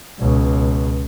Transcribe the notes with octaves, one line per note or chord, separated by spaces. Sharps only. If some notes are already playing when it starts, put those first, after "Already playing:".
C#2 B2